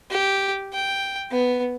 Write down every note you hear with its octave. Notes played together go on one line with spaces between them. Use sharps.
G4
G5
B3